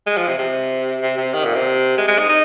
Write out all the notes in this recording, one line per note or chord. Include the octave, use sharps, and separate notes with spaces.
G#3
F3
C3
C3
C3
C3
D#3
A#2
C3
G#3
G#3
D#4
D#4